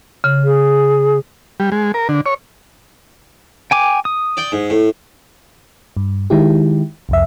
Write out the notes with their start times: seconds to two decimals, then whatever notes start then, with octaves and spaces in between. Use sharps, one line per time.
0.24 C#3
0.44 G#4
1.60 G3
1.72 G#3
1.94 A#4
2.09 D3
2.26 C#5
3.71 G5 G#5 D6
4.05 D#6
4.37 D5 G5
4.52 G#2
4.70 A2
5.97 G2
6.30 D#3 G#3 E4 G4
7.09 C2 F2 E5